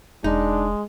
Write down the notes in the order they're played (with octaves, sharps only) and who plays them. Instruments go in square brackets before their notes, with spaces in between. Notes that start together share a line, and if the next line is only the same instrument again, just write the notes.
[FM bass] E1 [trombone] G#3 [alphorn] D4 [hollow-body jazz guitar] D#4